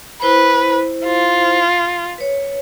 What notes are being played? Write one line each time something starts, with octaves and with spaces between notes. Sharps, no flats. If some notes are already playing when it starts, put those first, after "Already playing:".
E4 B4 C5
F4
B4 C#5